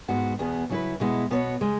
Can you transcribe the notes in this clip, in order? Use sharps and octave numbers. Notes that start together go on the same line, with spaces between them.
G#2 G#3 B3 F#4
E2 B2 B3 G#4
C#3 F#3 E4 B4
B2 G#3 B3 E4
B2 B3 F#4 C#5
C#3 G#3